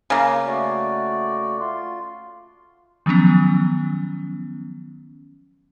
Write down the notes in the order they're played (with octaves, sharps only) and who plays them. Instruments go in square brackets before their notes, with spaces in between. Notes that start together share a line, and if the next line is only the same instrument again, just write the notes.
[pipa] C#3 A#3
[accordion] A3 F#4 D5
F4 C6
[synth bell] D#3 F3 F#3 B3 C#4